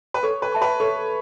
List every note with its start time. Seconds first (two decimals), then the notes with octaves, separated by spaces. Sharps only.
0.14 B4
0.23 A4 C#5
0.42 B4
0.52 E5 A5 C#6
0.62 B4
0.80 A4 C#5